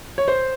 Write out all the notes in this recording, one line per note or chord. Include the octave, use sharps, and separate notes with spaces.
C#5
C5